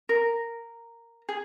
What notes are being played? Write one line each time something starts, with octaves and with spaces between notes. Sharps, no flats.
A#4
G#4